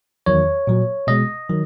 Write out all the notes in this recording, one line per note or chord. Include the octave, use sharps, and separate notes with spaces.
E2 D#3 F#3 C#5
A#2 F#3
B2 G#3 D#5
D#3 F#3